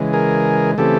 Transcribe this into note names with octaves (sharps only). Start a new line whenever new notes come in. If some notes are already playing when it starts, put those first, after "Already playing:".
Already playing: C#3 E3 G#3
G#4 A#4
C#3 E3 A3 C4 G4 A4